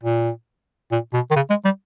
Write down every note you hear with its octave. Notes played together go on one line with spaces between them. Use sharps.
A#2
A#2
B2
D#3
C#3
G#3
G3